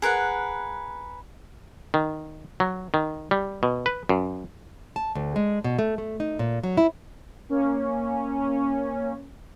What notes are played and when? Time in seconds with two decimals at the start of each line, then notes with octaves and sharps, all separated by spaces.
0.02 G#4 A#4 B4 F#5
1.94 D#3
2.60 F#3
2.94 D#3
3.31 G3
3.63 B2
3.86 B4
4.09 F#2
4.96 A5
5.15 D2
5.36 G#3
5.64 B2
5.79 A3
5.98 A3
6.20 D#4
6.39 A#2
6.63 F#3
6.77 E4
7.49 A#3 C#4